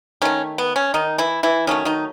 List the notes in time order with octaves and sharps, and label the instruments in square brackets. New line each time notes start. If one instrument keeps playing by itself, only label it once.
[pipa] D#3 A3 C#4
B3
C#4
D#3 D#4
E3 E4
E3 E4
D#3 F#3 A3 C#4
D#3 D#4